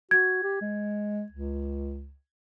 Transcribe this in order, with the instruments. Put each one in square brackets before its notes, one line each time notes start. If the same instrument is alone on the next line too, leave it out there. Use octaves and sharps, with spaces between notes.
[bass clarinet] F#4 [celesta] G#6
[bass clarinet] G4
G#3
C#2